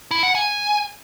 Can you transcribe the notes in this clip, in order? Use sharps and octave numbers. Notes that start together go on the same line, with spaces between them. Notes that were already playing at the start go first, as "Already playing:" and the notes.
E4
F#5
G#5